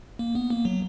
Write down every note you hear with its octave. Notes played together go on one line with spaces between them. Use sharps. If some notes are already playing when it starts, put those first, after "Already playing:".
A#3
B3
A#3
F#3